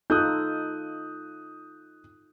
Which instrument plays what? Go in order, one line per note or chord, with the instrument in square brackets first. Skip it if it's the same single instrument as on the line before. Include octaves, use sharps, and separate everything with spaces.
[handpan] D#4 F4 A4 [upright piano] D#6 F#6 G6